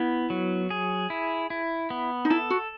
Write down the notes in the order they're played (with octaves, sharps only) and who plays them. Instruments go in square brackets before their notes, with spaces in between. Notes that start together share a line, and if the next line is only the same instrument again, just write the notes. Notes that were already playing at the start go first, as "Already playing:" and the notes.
Already playing: [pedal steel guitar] B3 [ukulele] E4
[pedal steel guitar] F#3
G#4
E4
E4
B3
[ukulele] D#4
[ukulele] E4 [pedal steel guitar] A4
[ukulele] F#4